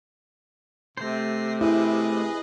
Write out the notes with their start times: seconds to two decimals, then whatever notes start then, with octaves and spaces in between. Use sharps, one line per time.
0.97 C3 A3 C5 A#6 C7
1.61 E4 G#4 B4 D#5